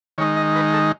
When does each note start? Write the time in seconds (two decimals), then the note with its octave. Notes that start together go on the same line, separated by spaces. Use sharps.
0.18 D#3 G#3 D#4 C#5
0.37 D#5
0.56 B4
0.73 A4